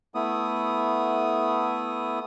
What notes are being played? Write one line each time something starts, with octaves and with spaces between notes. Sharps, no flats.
A3 B3 E4 D#6